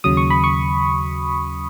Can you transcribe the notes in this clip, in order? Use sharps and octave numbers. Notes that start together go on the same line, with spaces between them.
D#2 C#3 F#3 D#6
C#6
B5
C#6